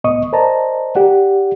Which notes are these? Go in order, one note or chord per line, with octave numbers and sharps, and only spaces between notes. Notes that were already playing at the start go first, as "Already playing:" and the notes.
C2 A2 B3 D#5 C#6 D#6
A#4 C5 D5 D#5 A5 A#5
G4 D5 F#5